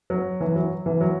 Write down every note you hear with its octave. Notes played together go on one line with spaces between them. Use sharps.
F#3
E3
F#3
E3
F#3